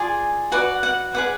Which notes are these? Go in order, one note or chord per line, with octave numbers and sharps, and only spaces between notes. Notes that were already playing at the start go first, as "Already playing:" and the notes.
Already playing: F4 G#4 D5 G#5
F#4 B4 D5 F#5
F#5
G#4 B4 D5 F#5